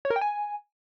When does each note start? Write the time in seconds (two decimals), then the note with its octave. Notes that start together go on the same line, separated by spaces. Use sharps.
0.05 C#5
0.10 A#4
0.16 G5
0.21 G#5